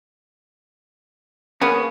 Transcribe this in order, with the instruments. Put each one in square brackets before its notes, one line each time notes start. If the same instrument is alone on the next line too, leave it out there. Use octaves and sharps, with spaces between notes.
[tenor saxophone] A#3 [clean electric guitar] B3 C#4 [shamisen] G#4 B4